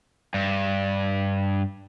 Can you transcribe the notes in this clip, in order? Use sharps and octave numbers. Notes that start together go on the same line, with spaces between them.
G2